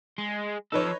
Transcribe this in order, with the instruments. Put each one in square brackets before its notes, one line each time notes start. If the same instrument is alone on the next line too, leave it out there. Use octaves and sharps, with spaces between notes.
[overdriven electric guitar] G#3
[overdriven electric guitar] F3 A4 [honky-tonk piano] D#4 B4 C#5